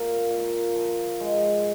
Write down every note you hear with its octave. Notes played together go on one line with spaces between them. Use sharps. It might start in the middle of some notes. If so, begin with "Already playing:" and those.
Already playing: A#2 A#4
A#2
F3
G#3